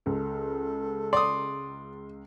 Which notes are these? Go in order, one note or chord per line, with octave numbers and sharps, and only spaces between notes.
C#2 A4
D5 C6 D#6